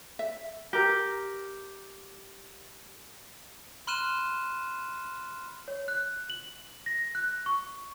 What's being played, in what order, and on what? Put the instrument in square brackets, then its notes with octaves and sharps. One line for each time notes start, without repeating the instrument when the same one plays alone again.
[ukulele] E5
G4 A#4
[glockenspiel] B5 C6 F6 F#6 D#7 E7
[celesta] C#5
F#6
F#7
A#6
F#6
C#6